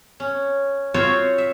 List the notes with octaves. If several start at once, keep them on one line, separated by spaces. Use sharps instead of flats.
C#4
C4 F4 F#4 C5 C#5 G5
E5